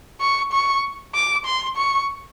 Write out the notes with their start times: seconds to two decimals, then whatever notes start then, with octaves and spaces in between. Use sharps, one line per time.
0.21 C#6
0.52 C#6
1.15 D6
1.45 C6
1.76 C#6